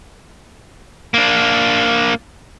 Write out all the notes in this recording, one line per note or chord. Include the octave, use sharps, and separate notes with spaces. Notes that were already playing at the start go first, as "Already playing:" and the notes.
A#3 D4